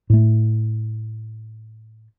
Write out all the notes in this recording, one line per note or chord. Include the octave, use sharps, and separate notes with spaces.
A2 A3